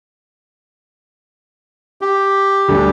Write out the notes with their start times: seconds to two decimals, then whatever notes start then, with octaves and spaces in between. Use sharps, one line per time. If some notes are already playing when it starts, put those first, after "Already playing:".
2.01 G4
2.68 D2 G3 D4